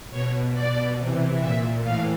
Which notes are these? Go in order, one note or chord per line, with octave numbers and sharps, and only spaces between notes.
B2 C#5
B2 D5
C3 E3
A#2 E5
A2 E3 F5